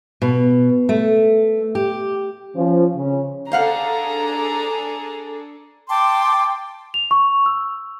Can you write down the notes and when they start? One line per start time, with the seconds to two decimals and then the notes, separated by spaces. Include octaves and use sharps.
0.22 B2
0.89 A3
1.75 G4
2.56 F3 C#4
2.96 C#3 C#4
3.52 D4 G#4 A4 C5 F5 F#5 A#5
5.89 G5 A5 C6 D6
6.94 F7
7.11 C#6
7.46 E6